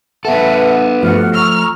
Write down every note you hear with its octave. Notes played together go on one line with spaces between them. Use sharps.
B3 A4 B4 E5 F#5
G2 F3 A3 F#4 F#5 F6
A#5 C#6 E6 F6